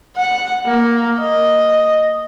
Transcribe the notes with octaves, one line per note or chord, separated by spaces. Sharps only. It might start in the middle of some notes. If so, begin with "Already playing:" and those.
F#5
A#3
D#5